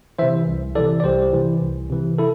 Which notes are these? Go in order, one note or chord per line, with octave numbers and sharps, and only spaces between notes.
C3 E3 C5 E5
C2
C3 E3 A4 D5
D5
C2 G4 C5
C3 E3
C2
C3 E3
E4 A4